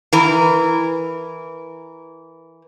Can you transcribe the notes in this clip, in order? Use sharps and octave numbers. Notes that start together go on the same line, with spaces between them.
E3 A#4